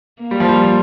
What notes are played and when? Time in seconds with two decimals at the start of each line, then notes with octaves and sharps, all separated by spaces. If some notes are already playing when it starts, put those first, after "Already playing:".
0.22 A#3
0.31 G3
0.40 F3
0.49 G3
0.63 F3